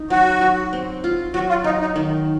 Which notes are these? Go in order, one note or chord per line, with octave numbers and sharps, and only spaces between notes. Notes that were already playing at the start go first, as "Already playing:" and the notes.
Already playing: D#4
F#3 F#4
F#3
C4
F4
F#3 F#4
F4
F#3 D#4
D#4
D#3